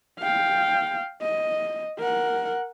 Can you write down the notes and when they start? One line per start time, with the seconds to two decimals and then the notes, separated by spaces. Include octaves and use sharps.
0.20 F5 G5
1.22 D#5
1.99 A#4 F#5